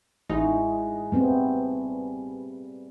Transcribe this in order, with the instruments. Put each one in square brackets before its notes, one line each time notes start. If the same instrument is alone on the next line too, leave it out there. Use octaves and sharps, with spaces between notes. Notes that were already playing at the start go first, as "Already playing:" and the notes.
[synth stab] A1 D#4 [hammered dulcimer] G#3 E4 F#4
[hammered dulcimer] G2 [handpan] A3 B3 C4